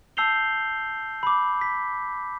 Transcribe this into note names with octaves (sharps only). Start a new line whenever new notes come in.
A5 E6 G6 C7 F7 G7
B5 D6
B6